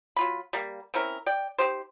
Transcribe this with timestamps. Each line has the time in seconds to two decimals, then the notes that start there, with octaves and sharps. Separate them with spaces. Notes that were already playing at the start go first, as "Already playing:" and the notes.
0.16 F#3 F4 B5
0.53 G3 A#3
0.94 C4 C#4 E4 A#4
1.26 D5 G5
1.58 D#4 G4 C5